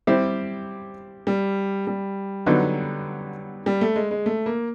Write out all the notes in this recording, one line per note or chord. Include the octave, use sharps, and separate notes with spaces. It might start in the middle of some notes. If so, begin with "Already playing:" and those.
G3 C4 E4 G4 C5
G3
G3
D3 F#3 B3 D#4
G3
A3
G#3
G#3
A3
A#3